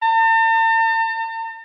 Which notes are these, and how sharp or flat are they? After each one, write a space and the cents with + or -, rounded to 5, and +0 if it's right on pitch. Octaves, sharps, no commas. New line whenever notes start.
A5 +45